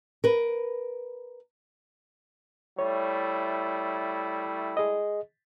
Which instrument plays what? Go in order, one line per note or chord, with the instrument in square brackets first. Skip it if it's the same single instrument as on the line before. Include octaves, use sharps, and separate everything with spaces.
[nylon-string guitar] A#4 B4
[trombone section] G3 A3 E4 [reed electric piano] C#5
[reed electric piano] G#4 D#5